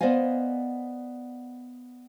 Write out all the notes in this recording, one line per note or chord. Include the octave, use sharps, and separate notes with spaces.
B3 C5 D5 D#5 F5 G#5